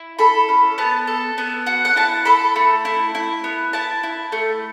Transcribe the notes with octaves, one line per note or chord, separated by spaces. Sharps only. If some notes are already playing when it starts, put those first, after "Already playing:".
Already playing: E4
A4 B5
C#4
B3 A5
A4
B3
F#4
F#5
E4 A5
A4 B5
A3
E4
E4
B3
E4 A5
E4
A3